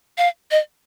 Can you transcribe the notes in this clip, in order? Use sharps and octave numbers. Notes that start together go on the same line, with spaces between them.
F5
D#5